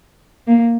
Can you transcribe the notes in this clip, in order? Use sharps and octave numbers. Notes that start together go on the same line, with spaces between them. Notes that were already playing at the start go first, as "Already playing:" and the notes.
A#3